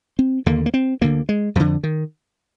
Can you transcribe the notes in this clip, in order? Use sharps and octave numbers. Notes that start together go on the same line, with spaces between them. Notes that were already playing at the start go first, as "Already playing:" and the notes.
C4
D#2 D3 A#3
A#3
C4
D2 D3 A#3
G#3
F2 D3 F3
D#3